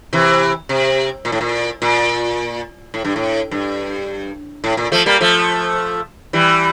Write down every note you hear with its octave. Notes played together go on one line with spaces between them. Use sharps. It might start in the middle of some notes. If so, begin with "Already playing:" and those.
C3 E3
C3
A#2
A2
A#2
A#2
A2
G2
A2
G2
A2
A#2
F3 A3
G3 A#3
F3 A3
E3 G3